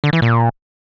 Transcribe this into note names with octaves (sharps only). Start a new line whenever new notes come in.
D3
E3
A#2